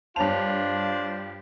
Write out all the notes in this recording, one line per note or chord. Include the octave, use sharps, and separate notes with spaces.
G2 D4 F4 C5 C#5 A5 F7